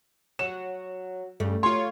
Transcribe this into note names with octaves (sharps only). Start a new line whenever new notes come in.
F#3 F#4 E7
G2 C#3 A3
F4 C#5 C6